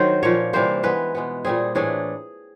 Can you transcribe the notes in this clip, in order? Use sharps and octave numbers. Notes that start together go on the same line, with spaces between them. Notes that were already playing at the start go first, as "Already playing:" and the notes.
Already playing: D#3 F#3 C5
A#2 F3 A#3 C#5
C3 E3 G3 A#3 C5
E3 G#3 B3 B4
B2 G#3 B3
A#2 G3 C4 G#4
A2 E3 A3 D4 G#4